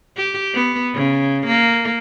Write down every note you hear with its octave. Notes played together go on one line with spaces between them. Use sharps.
G4
B3
C#3
A#3